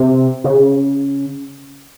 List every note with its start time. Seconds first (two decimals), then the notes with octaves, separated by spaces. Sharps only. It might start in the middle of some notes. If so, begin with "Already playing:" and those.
Already playing: C3
0.44 C#3